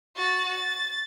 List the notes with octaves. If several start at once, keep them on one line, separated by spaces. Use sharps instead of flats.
F#4 A6
A6